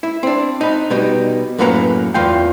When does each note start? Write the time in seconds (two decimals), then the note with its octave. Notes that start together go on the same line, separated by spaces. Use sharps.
0.03 E4
0.23 C4 D4
0.61 D#4 B4
0.90 B2 G3 D#4
1.58 F#2 A2 A#3 B4 F#5 A#5
2.14 E2 F4 F5 G5